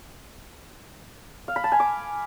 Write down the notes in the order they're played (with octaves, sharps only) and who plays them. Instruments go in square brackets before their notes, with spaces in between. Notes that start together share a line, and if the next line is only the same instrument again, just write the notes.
[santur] F5
B5
A5
G#5
D6